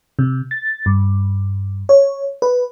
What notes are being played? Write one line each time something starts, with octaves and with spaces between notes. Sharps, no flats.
C3
A6
G2
C#5
B4